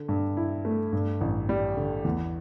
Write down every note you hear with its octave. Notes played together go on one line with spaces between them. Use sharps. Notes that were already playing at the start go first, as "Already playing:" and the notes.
Already playing: D3
G2
E4
A3
G2
A1
G3
D3
E2